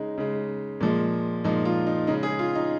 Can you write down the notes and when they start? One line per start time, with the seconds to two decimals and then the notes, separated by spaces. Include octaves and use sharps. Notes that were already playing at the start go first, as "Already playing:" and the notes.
Already playing: C#3 G#3 D#4
0.18 C#3 G#3
0.80 A#2 F3 G#3
1.44 A#2 F3 G#3 D#4
1.65 F4
1.87 D#4
2.07 C#3 G#3 D#4
2.23 G#4
2.39 F4
2.55 D#4